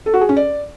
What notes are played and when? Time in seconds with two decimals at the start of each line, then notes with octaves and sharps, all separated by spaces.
0.06 A4
0.14 F#4
0.21 G#4
0.29 C#4
0.37 D5